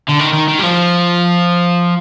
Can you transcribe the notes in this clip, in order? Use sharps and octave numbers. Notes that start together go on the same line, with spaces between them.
D3
D#3
D#3
D#3
G3
F3